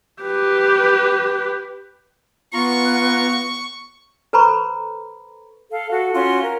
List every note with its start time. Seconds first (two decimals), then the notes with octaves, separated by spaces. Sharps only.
0.22 G4 B4
2.53 B3 F4 A#5 C#6
4.33 A4 B4 C5 A#5 B5 C#6
5.72 A4 F5
5.90 F#4 A4
6.14 C#4 F4 F#4 C6
6.41 A#4